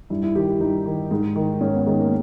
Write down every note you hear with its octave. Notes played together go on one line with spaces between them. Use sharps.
G2 E4
E4
D#3 G4
E4
G2 D#4
D#3
G#2
D#3
G#2 C#4
B3
D#3 G#3
A#3